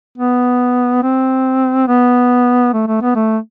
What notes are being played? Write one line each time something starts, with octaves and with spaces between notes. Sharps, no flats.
B3
C4
B3
A3
A3
B3
A3